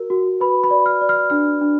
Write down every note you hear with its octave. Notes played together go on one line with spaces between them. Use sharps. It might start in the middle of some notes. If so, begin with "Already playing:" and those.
Already playing: F#4 A#4
F#4
B4 B5
B5
D5
F6
D5
F6
D4 F6
D4